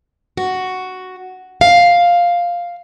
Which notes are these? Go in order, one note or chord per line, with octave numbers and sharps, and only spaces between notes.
F#4
F5